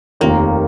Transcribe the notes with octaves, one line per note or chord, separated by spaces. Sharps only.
F1 D#2 D#3 A#3